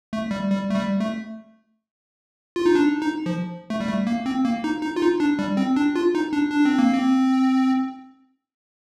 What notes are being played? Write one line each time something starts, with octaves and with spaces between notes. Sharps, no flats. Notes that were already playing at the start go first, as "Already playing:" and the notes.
A3
G3
G3
A3
G3
A3
F4
D#4
D4
D#4
F3
A3
G3
A3
A#3
C4
A#3
D#4
D#4
F4
D#4
D4
G3
C4
D4
F4
D#4
D4
D4
C4
A#3
C4